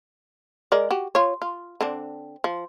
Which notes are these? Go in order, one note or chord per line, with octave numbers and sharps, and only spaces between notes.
G#3 A#4 D5
F#4 G4
F4 C#5
F4
D3 C4 D4
F3